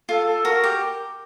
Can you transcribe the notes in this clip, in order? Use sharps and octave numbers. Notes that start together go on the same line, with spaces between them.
F4 A4
A4
F#4 A#4
G4